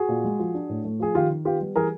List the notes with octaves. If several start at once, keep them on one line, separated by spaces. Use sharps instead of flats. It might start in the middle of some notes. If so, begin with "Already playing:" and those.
Already playing: F#4 G#4
A#2
G#3
F3
D4
A2
A3
F3 G#4
D#3 F4 G4
D#3
B3 F4 G4
G3
E3 G#4 A#4